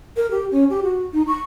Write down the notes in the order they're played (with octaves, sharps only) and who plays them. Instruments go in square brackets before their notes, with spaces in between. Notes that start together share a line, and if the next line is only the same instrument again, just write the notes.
[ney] A#4
G4
C#4
G4
F#4
D#4
C#6